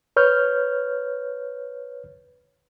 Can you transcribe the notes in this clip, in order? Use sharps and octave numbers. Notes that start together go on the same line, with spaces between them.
B4 C#5 F6 G6